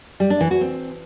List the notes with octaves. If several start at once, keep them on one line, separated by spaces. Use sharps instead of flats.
G3
D4
E3
F#4
C4